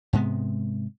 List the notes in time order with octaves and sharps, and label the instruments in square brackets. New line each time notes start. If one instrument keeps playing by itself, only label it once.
[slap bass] G#2 C3 G#3 B3